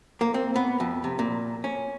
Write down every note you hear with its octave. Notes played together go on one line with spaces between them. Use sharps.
A#3
C4
B3
F2
C3
A#2
C#4